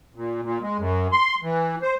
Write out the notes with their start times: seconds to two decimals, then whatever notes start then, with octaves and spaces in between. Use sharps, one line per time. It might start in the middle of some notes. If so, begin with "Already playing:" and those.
0.15 A#2
0.43 A#2
0.62 G#3
0.78 F#2
1.12 C6
1.42 E3
1.82 C5